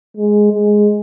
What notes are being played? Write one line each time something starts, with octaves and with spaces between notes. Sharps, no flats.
G#3
G#3